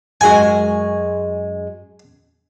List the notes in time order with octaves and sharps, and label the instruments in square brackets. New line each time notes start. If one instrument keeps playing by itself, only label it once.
[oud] F#2 G#3 F#4 [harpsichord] G#5